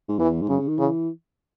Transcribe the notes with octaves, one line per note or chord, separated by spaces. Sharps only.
G#2
E2 E3
G#2
F#2 C#3
C#3
D#3
C#3 E3